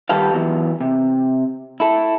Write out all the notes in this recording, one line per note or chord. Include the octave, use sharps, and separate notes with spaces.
D#3 G3 G4 A4 B4 F5
E3 F#3 B3
C3
E4 A4